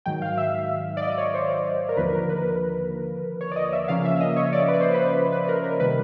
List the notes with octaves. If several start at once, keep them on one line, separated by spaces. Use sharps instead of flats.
G#2 D#3 F#3 G5
F5
E5
D5
D#5
C#5
C5
A#4
D#2 D3 F3 A#3 B4
A#4
B4
C#5
D5
D#5
E5
C#3 F3 A#3 C#4 F5
F5
E5
D#5
C#5
D5
B4
C5
B4
B4
A#4
A#4
C3 D#3 G3 B4